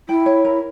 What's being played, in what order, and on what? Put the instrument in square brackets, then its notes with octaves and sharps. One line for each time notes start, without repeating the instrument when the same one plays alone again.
[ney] E4 [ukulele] G5
[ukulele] C#5
A#4